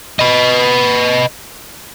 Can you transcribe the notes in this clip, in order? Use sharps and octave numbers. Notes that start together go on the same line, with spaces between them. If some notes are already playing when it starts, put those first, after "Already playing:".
B4 D#5